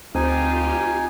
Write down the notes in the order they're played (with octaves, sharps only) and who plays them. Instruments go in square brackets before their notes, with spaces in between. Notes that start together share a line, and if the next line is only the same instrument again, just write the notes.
[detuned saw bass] D2 [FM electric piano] C4 [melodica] D#4 G#5 [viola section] F4 G4